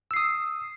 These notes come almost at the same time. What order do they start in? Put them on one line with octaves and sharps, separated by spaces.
E6 C7 D#6